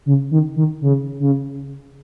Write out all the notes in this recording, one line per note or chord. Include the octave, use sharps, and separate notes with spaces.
C#3
D#3
D#3
C#3
C#3